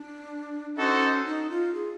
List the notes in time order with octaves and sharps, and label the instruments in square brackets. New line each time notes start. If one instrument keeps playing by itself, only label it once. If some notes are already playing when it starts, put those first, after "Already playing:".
Already playing: [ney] D4
[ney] C#4 [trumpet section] D#4 F#4 A4 C5
[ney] D#4
F4
G#4